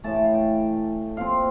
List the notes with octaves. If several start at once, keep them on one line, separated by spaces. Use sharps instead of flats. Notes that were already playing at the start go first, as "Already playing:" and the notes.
A2 E3 A3 A5
G5
F5
G5
A#2 F3 C4 F5